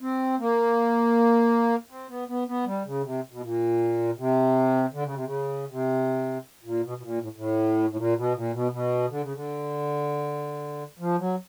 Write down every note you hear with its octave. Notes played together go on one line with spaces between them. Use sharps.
C4
A#3
C4
B3
B3
B3
G3
C#3
C3
B2
A#2
C3
D3
C#3
C3
C#3
C3
A#2
B2
B2
A#2
A2
A2
A2
A#2
B2
A#2
B2
B2
D3
C#3
D3
F3
F#3